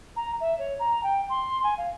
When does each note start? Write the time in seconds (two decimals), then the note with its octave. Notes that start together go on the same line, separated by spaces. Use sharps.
0.16 A#5
0.40 E5
0.58 C#5
0.79 A#5
1.03 G5
1.29 C6
1.63 G#5
1.78 F5